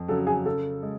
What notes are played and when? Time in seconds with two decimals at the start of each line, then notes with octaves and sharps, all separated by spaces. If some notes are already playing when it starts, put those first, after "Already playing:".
Already playing: F2
0.08 C#3 F#3 A4
0.27 G#4
0.45 C#3 A4
0.83 G#3